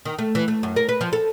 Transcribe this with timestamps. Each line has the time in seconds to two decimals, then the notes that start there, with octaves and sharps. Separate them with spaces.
0.05 D#3
0.19 A3
0.35 E3
0.48 A3
0.63 F#2
0.76 A#4
0.89 B4
1.01 F3
1.13 A4